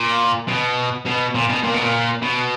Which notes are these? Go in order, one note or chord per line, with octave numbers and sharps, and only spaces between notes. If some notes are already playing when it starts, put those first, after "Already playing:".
Already playing: A#2
B2
B2
A#2
B2
A#2
B2
A#2
B2